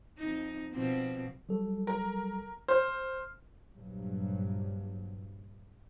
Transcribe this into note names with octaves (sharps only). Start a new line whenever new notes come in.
F2 D#4
B2 F3 C4
F#3 G3 A4
A#4
C5 F6
A#1 G2 F#3